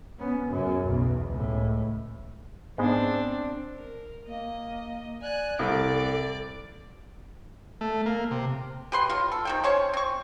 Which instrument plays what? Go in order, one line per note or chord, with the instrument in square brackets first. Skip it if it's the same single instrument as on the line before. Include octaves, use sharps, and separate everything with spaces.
[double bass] B3 C#4
F#2 C#3
B1 E2
C#2 A2
[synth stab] G#2 G#3 B3 [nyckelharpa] C4 D4
[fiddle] A#4
[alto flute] A#3 [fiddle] D#5
[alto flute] D5 [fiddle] G#5 F#6
[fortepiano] C2 [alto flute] A4 [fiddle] D5 D6
[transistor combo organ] A3
A#3
C3
[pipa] G4 B4 C6
F#3 F4
A4
C3 D#3 G5
C#4 C5 C#5
C4 C#6